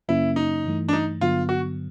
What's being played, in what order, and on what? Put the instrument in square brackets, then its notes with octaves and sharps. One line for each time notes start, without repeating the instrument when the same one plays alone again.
[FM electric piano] F#2 C#3 F#3 A#3 C#4 [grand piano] E4
[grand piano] D#4
[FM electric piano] G2 E3 A3
[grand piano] D4
D#4
[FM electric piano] G2 D3 F#3 B3 [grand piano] F4
[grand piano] F#4